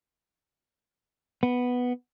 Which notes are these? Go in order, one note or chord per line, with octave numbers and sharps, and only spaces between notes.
B3